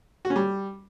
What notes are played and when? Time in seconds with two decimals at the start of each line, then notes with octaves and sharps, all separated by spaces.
0.25 F#4
0.30 C#4
0.36 G3